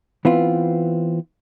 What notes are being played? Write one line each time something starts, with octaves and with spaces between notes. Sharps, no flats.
E3 B3 C4 F4